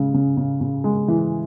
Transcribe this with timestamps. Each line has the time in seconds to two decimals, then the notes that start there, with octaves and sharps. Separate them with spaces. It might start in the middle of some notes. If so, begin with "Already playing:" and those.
Already playing: C#3 G#3
0.14 C#3
0.37 C#3
0.61 C#3
0.84 G#3
1.08 E3